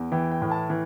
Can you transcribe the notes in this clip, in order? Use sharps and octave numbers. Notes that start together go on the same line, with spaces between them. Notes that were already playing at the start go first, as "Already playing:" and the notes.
Already playing: E2
E3 G5
G5
A2
A5
E3